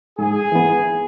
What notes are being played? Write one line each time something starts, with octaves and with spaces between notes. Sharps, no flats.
G#2 G#4
E3 B3